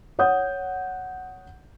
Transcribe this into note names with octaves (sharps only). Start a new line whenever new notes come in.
C#5 F#5 D#6 G6